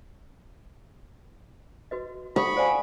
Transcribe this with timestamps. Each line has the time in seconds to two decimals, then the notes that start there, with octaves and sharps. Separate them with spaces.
1.91 F#4 B4 D#5
2.36 A4 B5 C#6 D#6
2.57 C5 D5 F5 F#5 G#5